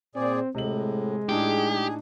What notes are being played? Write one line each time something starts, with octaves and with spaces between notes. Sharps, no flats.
A#2 C4 G#4 D5
A2 C3 G#3 D#5 F#7
A2 D4 D#4 G4 G#4